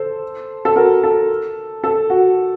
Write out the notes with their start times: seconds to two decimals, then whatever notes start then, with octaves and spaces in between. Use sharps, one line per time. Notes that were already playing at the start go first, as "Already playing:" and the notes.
Already playing: A4 C5
0.65 A4
0.76 F#4 A#4
1.04 A4
1.84 A4
2.10 F#4